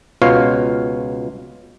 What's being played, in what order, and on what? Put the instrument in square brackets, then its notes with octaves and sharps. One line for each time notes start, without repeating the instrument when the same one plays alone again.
[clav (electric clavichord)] C#2 B2 F4 C#5 F5